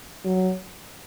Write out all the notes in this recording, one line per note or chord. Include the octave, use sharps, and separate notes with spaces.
F#3